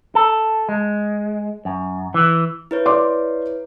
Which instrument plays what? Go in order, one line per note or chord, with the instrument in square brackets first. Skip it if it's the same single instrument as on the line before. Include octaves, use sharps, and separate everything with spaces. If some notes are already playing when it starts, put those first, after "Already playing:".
[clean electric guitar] A4
G#3
F#2
E3
[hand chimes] E4 B4 C#5
[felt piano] D5 C6 D6